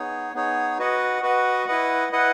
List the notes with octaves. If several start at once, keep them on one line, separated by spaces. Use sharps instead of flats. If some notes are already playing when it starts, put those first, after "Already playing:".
Already playing: B3 D#4 G#4 C#5
B3 D#4 G#4 C#5
F#4 B4 D#5 F#5
F#4 B4 D#5 F#5
E4 B4 D#5 F#5
E4 B4 D#5 F#5